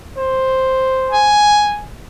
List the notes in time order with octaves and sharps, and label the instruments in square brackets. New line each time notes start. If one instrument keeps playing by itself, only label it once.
[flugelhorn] C5
[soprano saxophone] G#5